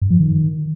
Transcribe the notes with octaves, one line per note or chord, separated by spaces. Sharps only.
G2
F3
D#3